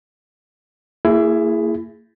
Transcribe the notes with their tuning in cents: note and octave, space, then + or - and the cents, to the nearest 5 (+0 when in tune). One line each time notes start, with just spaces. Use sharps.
A#3 -35 E4 +20 G#4 +0